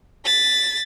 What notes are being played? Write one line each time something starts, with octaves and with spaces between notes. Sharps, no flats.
A6 B6